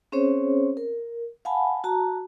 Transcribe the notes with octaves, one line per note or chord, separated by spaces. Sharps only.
C4 C#4 G#4 C5 C#5
A#4
F5 F#5 G#5 A5 B5
F#4 A5 A#5